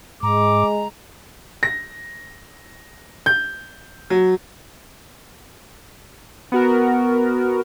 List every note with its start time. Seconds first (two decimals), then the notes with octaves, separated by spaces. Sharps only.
0.23 G#2 G#3 A#5 D6
1.63 A#6
3.26 G6
4.10 F#3
6.52 B3 F#4 A#4